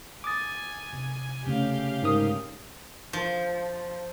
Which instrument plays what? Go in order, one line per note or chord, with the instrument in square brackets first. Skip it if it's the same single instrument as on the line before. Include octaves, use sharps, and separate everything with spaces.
[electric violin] G#5 [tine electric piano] D6 D#6 A6
[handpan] C3
[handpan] C#3 A3 C#4 [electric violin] G4 F5
[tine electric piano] G#2 A#4 D#6
[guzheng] F3